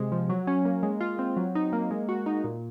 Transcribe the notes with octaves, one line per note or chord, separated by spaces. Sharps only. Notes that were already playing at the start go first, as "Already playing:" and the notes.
Already playing: C3 G#3
F3
F#3
C#4
A#3
G#3
F4
C4
F#3
D#4
A#3
G#3
F#4
D#4
A#2